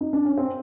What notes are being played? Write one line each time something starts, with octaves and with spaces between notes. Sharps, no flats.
D#4
D4
C#4
C4